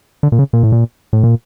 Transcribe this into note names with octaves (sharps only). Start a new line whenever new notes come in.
D3
A#2
C#3
A#2
A2
A#2
A2
A#2